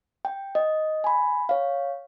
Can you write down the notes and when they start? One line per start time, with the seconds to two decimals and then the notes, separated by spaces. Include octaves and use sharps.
0.25 G5
0.55 D#5
1.04 G#5 B5
1.49 C#5 F5